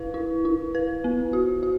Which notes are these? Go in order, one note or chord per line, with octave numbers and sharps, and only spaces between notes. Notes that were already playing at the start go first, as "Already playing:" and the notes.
Already playing: E4 B4
E4
E4
B4
B3
F#4
F#4